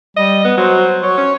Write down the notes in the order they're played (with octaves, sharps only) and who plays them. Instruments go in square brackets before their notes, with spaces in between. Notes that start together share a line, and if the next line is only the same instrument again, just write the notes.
[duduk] G3 [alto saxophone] D#5
[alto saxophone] B3
[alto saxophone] F#3 [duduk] C5
[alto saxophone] F#3 [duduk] C#5
[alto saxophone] C#4